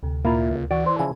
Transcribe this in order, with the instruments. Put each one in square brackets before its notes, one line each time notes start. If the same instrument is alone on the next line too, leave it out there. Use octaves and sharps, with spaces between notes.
[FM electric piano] D2 C3
[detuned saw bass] A#2 [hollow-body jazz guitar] A#3 F4 [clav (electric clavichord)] E4 A#4
[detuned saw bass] C#2
[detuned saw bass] E3 [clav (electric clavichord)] F#4 [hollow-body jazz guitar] D5
[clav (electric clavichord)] C5
[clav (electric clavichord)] C#3 F3 E4 [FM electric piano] G#5